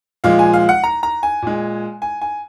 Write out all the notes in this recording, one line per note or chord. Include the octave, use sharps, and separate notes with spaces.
A#2 F3 G#3 F5
G#5
F5
F#5
A#5
A#5
G#5
A#2 G#3
G#5
G#5